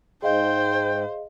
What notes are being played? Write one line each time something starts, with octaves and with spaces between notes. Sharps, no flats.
G#2 G#4 C5 D#5 F5 G5